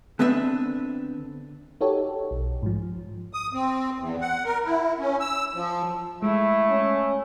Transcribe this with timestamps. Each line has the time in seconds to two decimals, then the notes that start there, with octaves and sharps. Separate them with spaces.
0.19 D3 B3 C4 D4 B4 E5
1.81 D#4 F#4 G4 A4 C#5
2.31 B1
2.63 G#2 F3
3.33 D#6
3.53 C4
3.99 E2
4.21 F#5
4.45 A#4
4.65 E4
4.99 C#4
5.20 E6
5.55 F3
6.22 G#3 A3 E4
6.70 C#4